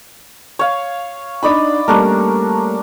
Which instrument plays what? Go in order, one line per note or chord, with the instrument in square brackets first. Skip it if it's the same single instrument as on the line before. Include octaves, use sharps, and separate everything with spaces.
[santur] C#5 F5
[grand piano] D4 D#4 [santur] D5 D#5 B5
[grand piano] G3 A3 A#3 [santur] C#4 D4 A#4